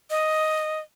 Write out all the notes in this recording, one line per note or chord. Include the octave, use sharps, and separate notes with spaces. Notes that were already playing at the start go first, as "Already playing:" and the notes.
D#5